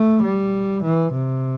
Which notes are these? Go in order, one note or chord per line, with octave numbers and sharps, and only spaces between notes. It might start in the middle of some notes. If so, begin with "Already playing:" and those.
Already playing: A3
G3
E3
C3